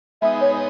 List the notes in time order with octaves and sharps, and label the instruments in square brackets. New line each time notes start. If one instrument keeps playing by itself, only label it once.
[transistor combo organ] G#3 B3 D#4 [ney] E5
[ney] C#5